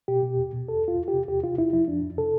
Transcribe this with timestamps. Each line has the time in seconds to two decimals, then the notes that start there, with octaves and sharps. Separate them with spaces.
0.08 B2 G4
0.23 B2
0.37 E2
0.53 B2
0.68 E2 A4
0.83 E2 F4
0.98 E2
1.08 G4
1.13 C3
1.28 E2 G4
1.43 C3 F4
1.58 E2 E4
1.73 F3 E4
1.88 F2 D4
2.03 F2
2.18 C3 A4